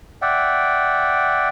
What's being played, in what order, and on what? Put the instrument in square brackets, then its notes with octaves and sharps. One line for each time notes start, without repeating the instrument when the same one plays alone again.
[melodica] D5 E5 F#5 G5